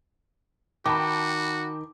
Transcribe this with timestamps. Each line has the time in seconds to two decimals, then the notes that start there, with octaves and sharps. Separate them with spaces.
0.86 D#3 F#4 G5 A5 B5 D6